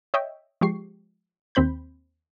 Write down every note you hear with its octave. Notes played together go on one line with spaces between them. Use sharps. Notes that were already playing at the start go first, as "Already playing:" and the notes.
C#5 D#5 E5 G5
F3 G#3 G4 C#6 C7
D#2 C4 C5 B5 G6